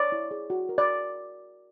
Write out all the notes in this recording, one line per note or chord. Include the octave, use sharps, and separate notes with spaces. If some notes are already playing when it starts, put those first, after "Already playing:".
Already playing: C#5 D5
E4
G#4
F#4
A#4
D5